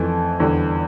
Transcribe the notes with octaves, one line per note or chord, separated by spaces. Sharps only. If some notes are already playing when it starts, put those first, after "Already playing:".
Already playing: F2 E3 A3
E2 D3 G3